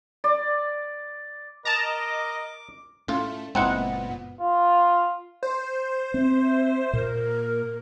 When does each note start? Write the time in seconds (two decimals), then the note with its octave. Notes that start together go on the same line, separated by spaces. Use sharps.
0.24 D5
1.65 A#4 D#5 A5 A#5 D6
3.08 A2 A3 C#4 F4
3.55 F#1 A#2 G#3 B3 C4 D#4 E4 F#5
4.40 F4
5.43 C5
6.14 C4 E5
6.93 A#2 A#3 A#4